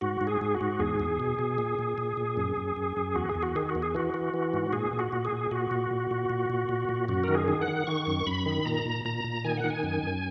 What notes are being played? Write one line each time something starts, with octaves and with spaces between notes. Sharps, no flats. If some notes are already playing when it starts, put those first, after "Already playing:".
G#2 F#4
G#2
G#4
G#2
F#4
G#2
E2 G#4
E2
B2
B2
A#2
A#2
A#2
A#2
F#2
F#2
F#2
F#2
E2 F#4
G#4
E2
F#4
D#3 G#4
F#4
E2
G#4
E3 F#4
E3
E3
G#2
A#2 G#4
A#2
F#4
A#2
G#4
A#2
A#2 F#4
A#2
A#2
A#2
A#2
A#2
A#2
A#2
F#2 F#4
D#3 A#4
G#4
D#3
F#5
D#3
D#3 C#6
F#2
F#2 B5
D#3
A#2 A#5
A#2
A#2 A#5
A#2
D#3 G#5
F#5
D#3
G#5
F#2
F#2